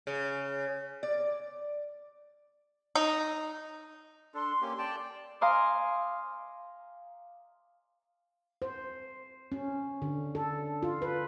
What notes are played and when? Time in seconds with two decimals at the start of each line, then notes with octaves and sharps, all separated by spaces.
0.07 C#3
1.03 D5
2.95 D#4
4.34 D4 A4 C6
4.61 A#3 C#4 G4
4.79 D5 G5 A5
5.41 F5 G#5 A#5 C6 D6 D#6
8.62 C5
9.52 C#4
10.02 D3
10.35 A4
10.83 F4
11.02 B4